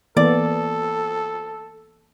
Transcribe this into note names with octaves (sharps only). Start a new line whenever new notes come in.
E3 A#3 B3 A4 D5